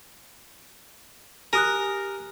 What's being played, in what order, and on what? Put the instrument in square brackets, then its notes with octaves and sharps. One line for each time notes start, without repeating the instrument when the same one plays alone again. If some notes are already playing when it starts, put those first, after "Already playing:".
[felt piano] G4 [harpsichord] A#4 [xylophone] G#5 D#6 F#6